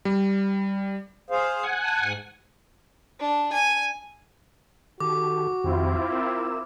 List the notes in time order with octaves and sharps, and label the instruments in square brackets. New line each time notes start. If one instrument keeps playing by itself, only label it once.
[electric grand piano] G3
[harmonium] G#4 C5 F5
[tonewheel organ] F#5 G#5
[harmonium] A5
G#2
[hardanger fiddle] D4
G#5
[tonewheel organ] D#3 G4 A4 [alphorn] F#4 [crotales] D6
[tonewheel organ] F2 D#3 G4 [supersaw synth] C4 E4 F4
[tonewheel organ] A#4 E6